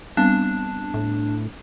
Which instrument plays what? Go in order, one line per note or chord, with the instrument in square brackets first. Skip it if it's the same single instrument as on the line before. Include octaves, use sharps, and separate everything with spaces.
[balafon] G3 B3 C4 [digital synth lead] D4
[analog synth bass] A2